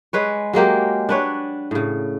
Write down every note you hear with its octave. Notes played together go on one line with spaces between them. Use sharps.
G#3 B4 C#5
F#3 G#3 A#3 G4
D4 B4 C#5
A2 C#3